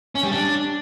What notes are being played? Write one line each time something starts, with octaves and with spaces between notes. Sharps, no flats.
C#4
G3
D4